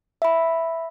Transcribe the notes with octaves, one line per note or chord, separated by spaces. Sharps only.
E5 B5